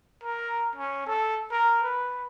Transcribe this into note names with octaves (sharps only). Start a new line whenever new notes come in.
A#4
C#4
A4
A#4
B4